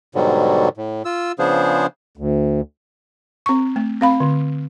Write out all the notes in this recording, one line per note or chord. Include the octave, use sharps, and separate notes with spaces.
G#2 B2 D3 F#3 G3
A2
F4 E6
C#3 F3 B3 D4 G#4 C5
D2
C4 C#6
A3
C4 F5 B5
D3